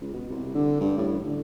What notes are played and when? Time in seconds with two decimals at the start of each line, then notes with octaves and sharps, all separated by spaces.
0.01 C#2
0.13 B2
0.30 C2
0.55 D3
0.80 G2
0.98 A2
1.12 A1
1.25 D3